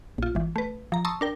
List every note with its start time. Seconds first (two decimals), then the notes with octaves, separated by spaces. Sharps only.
0.18 A#1 F4
0.35 G#1 E3
0.56 A3 B4
0.92 F3 A#5
1.05 A5 A#5 C6 C#6 D#6 E6
1.21 D4 A#4 G5